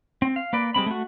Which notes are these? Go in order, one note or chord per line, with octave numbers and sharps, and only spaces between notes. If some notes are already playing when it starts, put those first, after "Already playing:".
C4
F5
A#3 B4 D5
G3 G#3 C4 B5
A3 F#4